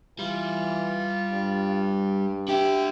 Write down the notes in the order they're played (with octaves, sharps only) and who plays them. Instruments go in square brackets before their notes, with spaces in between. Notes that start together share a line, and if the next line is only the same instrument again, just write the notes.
[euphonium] E3 [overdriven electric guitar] G3 [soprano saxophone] F4
[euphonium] G2
[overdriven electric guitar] D4 E5 [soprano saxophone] G4